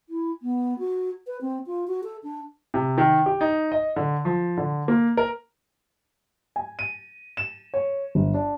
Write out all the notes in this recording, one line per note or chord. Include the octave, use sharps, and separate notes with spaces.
E4
B3
F#4
B4
C4
F4
F#4
A4
D4
C3
D#3
G4
D#4
D#5
D3
F3
D3
A#3
A#4
G#5
D#7
E7
C#5
G1
D4